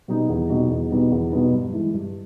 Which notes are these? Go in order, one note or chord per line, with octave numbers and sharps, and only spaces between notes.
B2 G3 B3 D#4
E2
B2 G3 B3 D#4
E2
B2 G3 B3 D#4
E2
B2 G3 B3 D#4
G2
E3 G#3
G2